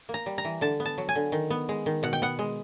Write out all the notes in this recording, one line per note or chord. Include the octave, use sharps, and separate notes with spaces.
A#3
A#5
G3
A#5
E3
D3 A5
B3
A5
F#3
G#5
D3
D#3
B3
G#3
D#3
B2 F#5
G5
B3 F#5
G#3